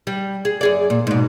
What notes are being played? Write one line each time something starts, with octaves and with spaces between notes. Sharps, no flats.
G3
G#4
F#2 G#4 D5
A#2
G#2 B2